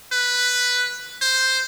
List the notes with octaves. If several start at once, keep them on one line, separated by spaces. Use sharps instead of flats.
B4
C5